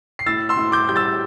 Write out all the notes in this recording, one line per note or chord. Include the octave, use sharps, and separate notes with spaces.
C7
A2 E6 A6
C6 E6
A2
D6 G6
G3 G6
E6 A6